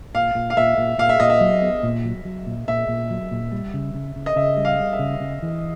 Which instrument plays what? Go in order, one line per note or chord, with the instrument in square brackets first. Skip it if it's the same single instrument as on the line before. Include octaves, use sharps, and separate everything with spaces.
[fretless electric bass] A#2 [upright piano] F5
[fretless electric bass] A#2
[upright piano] F5
[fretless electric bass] A#2 [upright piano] E5
[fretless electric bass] A#2
[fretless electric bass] A#2 [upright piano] F5
[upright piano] E5
[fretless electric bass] A#2 [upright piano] D#5
[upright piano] E5
[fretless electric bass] F#3
B3
A#2
F#3
F#3
A#2
[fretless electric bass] A#2 [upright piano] E5
[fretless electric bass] A#2
F#3
A#2
G3
C#3
C#3
C#3
[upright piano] D#5
[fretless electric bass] C#3 [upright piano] E5
[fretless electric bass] G3
[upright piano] F5
[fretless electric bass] G3
[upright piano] E5
[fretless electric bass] C#3
C#3
E3